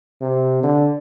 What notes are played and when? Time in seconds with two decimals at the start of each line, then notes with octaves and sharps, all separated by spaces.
0.21 C3
0.63 D3